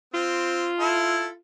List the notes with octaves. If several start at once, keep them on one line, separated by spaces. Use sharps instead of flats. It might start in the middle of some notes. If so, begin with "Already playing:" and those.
C4 F4
E4 A4